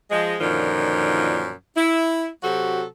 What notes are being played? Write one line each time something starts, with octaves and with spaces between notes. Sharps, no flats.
F3 G#3
F#2 A#2 D3 D#3 F3
E4
C3 F#3 F#4 G4 A4